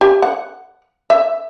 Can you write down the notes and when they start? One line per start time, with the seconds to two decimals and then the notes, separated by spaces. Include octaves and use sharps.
0.01 G4
0.22 F#5
1.10 E5